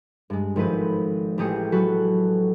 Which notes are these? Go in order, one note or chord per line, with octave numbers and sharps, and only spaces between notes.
G2 G#3
G#1 F3 A3 B4 D#7
A1 A3 G4 G#4 D#6 C#7
F#3 F#4 A4 B4